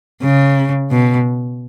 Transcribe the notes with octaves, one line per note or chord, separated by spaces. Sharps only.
C#3
B2